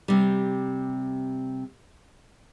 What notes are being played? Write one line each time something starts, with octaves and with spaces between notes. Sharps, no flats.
C3 G3